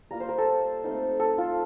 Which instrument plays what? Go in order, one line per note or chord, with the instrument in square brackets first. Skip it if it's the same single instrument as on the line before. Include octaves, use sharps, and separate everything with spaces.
[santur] G3 A#3 F4 A#5
C5
A#4
A4
A3 C4 D#4
A4
F4